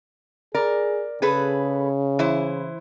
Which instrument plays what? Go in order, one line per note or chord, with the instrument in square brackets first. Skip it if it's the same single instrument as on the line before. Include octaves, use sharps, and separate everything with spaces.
[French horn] G#4 [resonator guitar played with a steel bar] A#4 D5
[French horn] C#3 [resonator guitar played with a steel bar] G#4 A4 B4
[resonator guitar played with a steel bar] E3 E4 C5